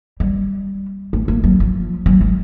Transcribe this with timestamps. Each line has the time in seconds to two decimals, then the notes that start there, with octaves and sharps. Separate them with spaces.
0.20 G3
1.13 A3
1.28 A#3
1.44 F#3
1.60 F3
2.06 F#3
2.21 G#3